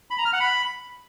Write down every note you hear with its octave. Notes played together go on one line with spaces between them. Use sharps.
B5
A#5
F6
F#5
B5